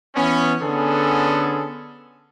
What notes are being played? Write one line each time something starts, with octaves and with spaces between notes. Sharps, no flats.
E3 B3 C#4
D3 B3 C#4 G#4 A4